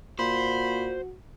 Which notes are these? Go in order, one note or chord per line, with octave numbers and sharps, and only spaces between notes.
A#2 F#4 C5 B5